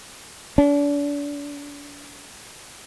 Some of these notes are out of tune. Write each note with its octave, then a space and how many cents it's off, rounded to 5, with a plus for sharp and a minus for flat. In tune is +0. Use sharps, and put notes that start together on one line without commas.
D4 -35